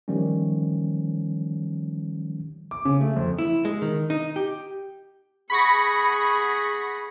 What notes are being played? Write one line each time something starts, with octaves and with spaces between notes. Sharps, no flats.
D#3 F3 G3 A3 C#4
D6
C#3
A3
F2
E4
G#3
D#3
D#4
G4
G#4 F#5 B5 C#6 A#6